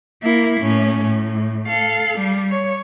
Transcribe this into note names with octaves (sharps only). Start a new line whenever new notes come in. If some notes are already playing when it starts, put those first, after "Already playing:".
A#3 E4
A2 C#4
A2
A4 F5
G3
C#5